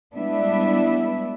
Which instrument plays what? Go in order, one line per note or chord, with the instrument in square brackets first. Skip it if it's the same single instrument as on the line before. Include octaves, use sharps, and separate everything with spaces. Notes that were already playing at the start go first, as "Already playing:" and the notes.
[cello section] G3 G#3 B3 D4 E4 E5